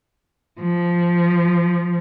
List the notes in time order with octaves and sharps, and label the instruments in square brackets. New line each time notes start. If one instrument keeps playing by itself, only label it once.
[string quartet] F3